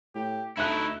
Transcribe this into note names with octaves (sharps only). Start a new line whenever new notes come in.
A2 G4
D2 A3 D#4 E4 E5 F#6